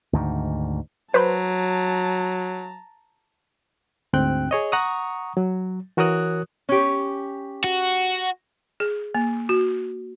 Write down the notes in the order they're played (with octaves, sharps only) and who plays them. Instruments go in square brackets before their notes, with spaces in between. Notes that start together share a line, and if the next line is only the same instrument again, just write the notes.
[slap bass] D2 G#2 D#3
[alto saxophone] F#3 [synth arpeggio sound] B4 C5 [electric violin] A5 A#5
[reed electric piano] D2 G#2 C4 G5 F#6
G#4 C#5 D#5
F#5 A#5 C#6 D#6
F#3
E3 F#4 A#4 C#5 D#6 F#6
[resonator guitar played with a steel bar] C#4 G4
[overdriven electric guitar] F#4
[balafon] G#4
A#3
F#4